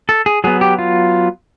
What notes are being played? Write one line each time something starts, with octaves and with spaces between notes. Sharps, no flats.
A4
G#4
F#3 B3 G#4
G4
F4